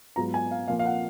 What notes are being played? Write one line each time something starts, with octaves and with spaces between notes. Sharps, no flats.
G#2 F#3 B3 F4 A#5
G#5
F5
A#2 F3 A#3 F4 F5
F5
F#5